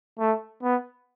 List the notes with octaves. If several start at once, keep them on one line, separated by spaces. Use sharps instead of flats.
A3
B3